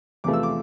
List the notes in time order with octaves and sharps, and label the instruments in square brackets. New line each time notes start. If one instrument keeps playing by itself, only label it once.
[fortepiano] E2 C3 F3 A3 D6
E6
D6